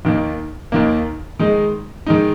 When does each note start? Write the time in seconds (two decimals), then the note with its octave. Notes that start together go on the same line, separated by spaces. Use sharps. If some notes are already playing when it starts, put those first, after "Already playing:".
0.05 D#2 D#3 A#3
0.72 D#2 D#3 A#3
1.39 D#3 G#3 D#4
2.06 D#3 G#3 D#4